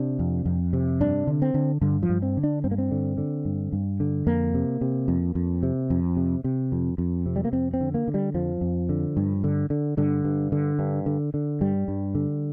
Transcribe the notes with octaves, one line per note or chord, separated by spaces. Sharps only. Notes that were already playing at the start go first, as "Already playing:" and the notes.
Already playing: C3 D4
F2
F2
C3
G2 D4
D3
C4
D3
G2 D3
F3
G2
C4
D3
D4
G2 C4
A#3
C4
D3
D3
G2
G2
D3
F2 A#3
C3
C3
F2
F2
C3
F2
C3
C3
F2
F2
C3
G3
A#3
F2 C4
C4
D3
A#3
D3
G3
F2 F3
F2
D3
G2
D3
D3
G2 D3
G2
D3
G2
D3
D3
G2 G3
G2
D3